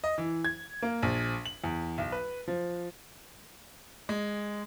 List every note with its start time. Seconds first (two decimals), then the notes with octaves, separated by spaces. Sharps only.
0.04 D#5
0.18 E3
0.45 G#6
0.82 A#3
1.03 A#1
1.46 F#7
1.64 E2
1.98 B1
2.12 B4
2.48 F3
4.09 G#3